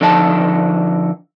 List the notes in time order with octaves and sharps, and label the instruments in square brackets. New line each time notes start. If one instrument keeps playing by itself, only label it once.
[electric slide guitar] D3 F3 D#4 D#5 A5